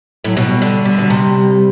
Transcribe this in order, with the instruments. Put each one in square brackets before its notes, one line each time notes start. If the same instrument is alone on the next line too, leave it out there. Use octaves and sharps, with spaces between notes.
[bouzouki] A2 [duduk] F#3
[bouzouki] B2 [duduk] G3
[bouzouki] D3
D3
B2
C3